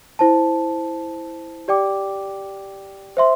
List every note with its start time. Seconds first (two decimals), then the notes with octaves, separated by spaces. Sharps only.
0.19 E4 C5 A5
1.68 G4 D5 G5 D6
3.17 C5 E5 C6